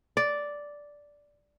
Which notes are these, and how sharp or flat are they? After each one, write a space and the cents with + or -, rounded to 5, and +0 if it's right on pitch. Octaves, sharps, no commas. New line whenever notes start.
D5 -5